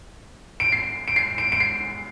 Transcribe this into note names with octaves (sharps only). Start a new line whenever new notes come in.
D7
C7
D7
C7
D7
D7
C7